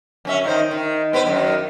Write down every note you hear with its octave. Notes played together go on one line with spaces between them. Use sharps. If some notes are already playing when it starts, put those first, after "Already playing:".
F#2 C#4 E5
D#3 D#4 C5
D#3
B3 B4 C5
F#2 D#3